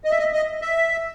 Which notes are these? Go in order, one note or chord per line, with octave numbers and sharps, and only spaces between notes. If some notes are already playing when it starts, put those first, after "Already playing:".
D#5
E5
D#5
D#5
E5